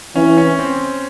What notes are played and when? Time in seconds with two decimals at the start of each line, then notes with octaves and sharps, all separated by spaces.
0.16 E3 C#4
0.37 C#4
0.59 C4